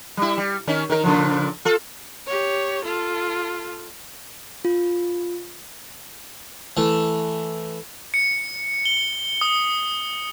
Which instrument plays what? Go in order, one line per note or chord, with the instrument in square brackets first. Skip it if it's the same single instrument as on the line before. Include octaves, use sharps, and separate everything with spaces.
[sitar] G3 E4
G3
D#3 C#4
D#3 A#4
A#2 C#3 F3
F4 A4
[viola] G4 C#5
F4 A4
[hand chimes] F4
[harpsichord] E3 A3
[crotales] C#7
G7
D#6